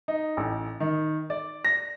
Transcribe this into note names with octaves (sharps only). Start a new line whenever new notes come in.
D#4
A1
D#3
D5
A#6